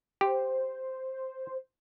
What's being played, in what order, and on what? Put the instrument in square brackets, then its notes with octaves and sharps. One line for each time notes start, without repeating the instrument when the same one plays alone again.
[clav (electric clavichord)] G4 [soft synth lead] C5